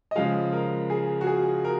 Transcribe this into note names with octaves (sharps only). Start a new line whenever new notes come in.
D#5
C#3 F3 G#3 F5
A#4
G#4
F#4
G#4
A#4